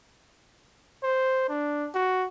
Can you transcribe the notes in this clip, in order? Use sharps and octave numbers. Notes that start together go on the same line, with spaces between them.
C5
D4
F#4